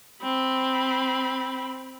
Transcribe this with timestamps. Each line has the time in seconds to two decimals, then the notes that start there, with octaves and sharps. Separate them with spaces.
0.22 C4 B5